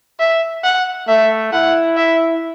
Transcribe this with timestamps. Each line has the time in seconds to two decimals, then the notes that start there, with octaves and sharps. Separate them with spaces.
0.20 E5
0.64 F#5
1.08 A3 E5
1.53 E4 F#5
1.97 E5